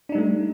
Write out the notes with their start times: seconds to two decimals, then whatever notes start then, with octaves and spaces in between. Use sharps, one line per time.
0.09 D4
0.12 D#4
0.15 G3
0.18 A3